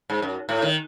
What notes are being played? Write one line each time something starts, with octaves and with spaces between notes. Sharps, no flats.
G#2
F#2
A2
D#3